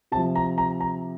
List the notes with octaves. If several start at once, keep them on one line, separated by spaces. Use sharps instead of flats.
C3 A5
F3
A#5
A#5
A#5